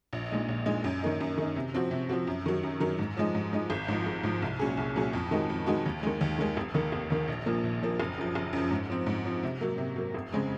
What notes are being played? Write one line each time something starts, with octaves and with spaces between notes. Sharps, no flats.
A#1
A#2 G#3 D#4
A#1
A#2 G#3 D#4
F#2
D#3 A#3 D#4
F#2
D#3 A#3 D#4
C3
F3 C4 F#4
C3
F3 C4 F#4
F#2
D#3 F#3
F#2
D#3 F#3
G#2
F3 G#3 D#4
G#2
F3 G#3 D#4
G#1
G#2 F3
G#1
G#2 F3
C2
A#2 F#3 C#4 G#4
C2
A#2 F#3 C#4 G#4
F2
D#3 G#3 D#4 F#4
F2
D#3 G#3 D#4 F#4
D#2
D#3 G#3
D#2
D#3 G#3
F1
D#2 D#3 A#3
F1
D#2 D#3 A#3
A#1
A#2 F3 A#3
A#1
A#2 F3 A#3
F#1
F#2 F3
F#1
F#2 F3
G#2
F3 C4
G#2
F3 C4
C3
F#3 A#3
C3
F#3 A#3
F1
C#3 G#3 C4